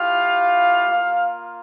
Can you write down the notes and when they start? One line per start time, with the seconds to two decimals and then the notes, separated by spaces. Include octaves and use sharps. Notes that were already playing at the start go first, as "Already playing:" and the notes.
Already playing: A3 E4 F4 G4 F5
0.89 A#3 F4